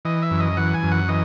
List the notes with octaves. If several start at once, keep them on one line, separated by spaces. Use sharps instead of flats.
E3 D#5
E5
F#2
D#5
E3 F#5
G#5
F#2
F#5
E3 D#5